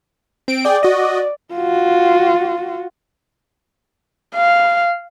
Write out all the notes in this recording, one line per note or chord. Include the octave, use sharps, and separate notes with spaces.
C4 D7
G#4 D5 G5
F#4 D#5
F4 F#4
F5